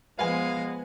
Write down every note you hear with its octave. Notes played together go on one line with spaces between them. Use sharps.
F3 G#3 B3 B4 F5 F#5 G#5